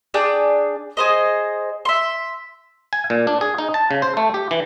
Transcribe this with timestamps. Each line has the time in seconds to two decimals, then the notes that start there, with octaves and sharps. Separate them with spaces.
0.14 D4 G#4 D5 G5
0.97 G#4 C5 D#5
1.85 E5 C6
2.93 G#5
3.10 A#2
3.27 D4
3.41 G#4
3.58 D#4
3.74 A5
3.91 C#3
4.02 C5
4.17 A3
4.34 G4
4.51 E3